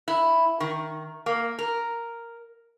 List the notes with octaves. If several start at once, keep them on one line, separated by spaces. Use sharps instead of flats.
E4
D#3
A#3
A#4